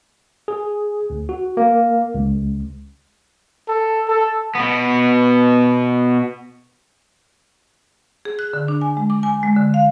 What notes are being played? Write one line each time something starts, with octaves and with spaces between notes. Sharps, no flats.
G#4
D2
F#4
A#3
C#2
A4
A4
B2 B3
G#4
F#6
D3
D4
G#5
G#3
D6
G#5
G#3
D3
F5